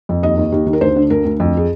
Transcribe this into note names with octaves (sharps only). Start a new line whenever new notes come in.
F2
D#2 D#5
D#2
D#2
D#3
A#4
D2 C5
D3
D2 A#4
D2
F2
G#4